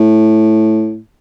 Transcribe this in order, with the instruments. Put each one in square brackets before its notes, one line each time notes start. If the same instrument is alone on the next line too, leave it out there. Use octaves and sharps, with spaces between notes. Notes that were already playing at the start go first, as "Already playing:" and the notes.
Already playing: [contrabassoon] A2